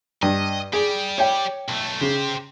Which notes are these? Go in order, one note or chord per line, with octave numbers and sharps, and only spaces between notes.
G2 D#5
G4 G#4 D5
C#5 G5
B1 A3
C#3 G4 C5